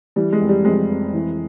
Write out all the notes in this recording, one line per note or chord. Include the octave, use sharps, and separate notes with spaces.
E3 G3
G#3
F1
G3
F2 G#3
F1
E3